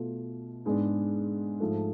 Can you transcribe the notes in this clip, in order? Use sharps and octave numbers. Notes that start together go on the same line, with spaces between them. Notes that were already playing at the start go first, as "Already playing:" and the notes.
Already playing: B2 A3 F4 A4
G#2 G#3 B3 D4 G#4
G#2 F3 A3